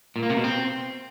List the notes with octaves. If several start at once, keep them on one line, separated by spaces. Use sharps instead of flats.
A#2
A#3
C3
B2
C4